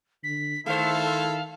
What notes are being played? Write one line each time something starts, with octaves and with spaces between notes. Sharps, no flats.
D3 B6
D#3 G#3 E4 A4 C5 F5